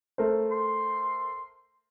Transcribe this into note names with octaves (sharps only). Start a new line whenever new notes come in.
A3 A#4 C5
C6